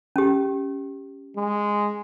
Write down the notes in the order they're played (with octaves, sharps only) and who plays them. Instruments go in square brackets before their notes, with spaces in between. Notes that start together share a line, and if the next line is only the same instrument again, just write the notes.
[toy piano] C#4 G4
[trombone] G#3